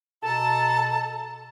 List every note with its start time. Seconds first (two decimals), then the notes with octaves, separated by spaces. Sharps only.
0.23 B2 A4 A5 A#5